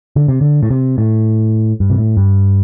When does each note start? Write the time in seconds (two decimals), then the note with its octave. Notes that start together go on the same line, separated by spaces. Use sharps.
0.16 D3
0.28 C3
0.41 D3
0.63 A2
0.71 C3
0.98 A2
1.80 G2
1.90 C3
1.98 A2
2.17 G2